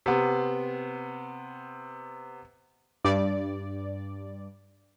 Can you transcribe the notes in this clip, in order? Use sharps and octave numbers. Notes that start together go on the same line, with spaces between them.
C3 B3
G2 D5